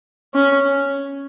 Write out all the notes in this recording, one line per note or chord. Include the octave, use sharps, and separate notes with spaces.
C#4